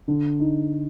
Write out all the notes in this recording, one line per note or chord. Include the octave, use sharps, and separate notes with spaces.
D3
D#4